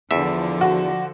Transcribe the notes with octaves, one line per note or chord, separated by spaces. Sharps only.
E2 D3 F3 E5
F#4